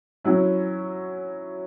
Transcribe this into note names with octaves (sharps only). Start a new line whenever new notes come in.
F#3 C#4 E4